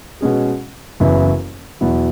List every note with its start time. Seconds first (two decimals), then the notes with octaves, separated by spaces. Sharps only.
0.21 B2 G#3 C#4 G#4
1.00 F#1 F#2 E3 B3 E4
1.81 E2 B2 F#3 E4